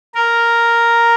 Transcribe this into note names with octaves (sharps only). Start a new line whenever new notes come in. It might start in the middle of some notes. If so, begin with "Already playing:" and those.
A#4